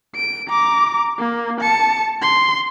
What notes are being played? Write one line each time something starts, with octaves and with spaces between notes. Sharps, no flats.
D7
A#5 D6
A#3
A5 C#7
C6